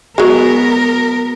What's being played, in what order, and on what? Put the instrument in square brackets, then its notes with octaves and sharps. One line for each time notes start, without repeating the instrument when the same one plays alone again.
[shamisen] F#3 G#3 [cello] B3 A#4